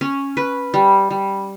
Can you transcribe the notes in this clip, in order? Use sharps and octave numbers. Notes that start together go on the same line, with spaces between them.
C#4
B4
G3
G3